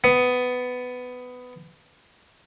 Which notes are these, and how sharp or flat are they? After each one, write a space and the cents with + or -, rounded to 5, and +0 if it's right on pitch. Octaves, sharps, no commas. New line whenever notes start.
B3 +15